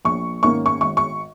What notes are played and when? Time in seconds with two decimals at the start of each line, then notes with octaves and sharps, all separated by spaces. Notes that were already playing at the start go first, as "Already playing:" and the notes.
0.05 A#1 C#6
0.43 G#2 D#3 A#3 C#4 C#6
0.66 C#6
0.81 G#1 C#6
0.97 C#6